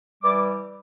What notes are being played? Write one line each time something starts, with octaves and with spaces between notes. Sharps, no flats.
E3 G3 D6